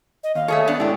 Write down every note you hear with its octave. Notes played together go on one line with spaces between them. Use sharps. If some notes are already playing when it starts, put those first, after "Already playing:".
D#5
D#2 F5
A3 G#4 A4 C#5
B3 D4 D5
G#2 D3 D4 E4 G4